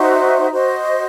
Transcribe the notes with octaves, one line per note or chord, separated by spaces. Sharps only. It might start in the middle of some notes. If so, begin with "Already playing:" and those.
Already playing: D#4 F#4 C5 E5
F#4 C5 D#5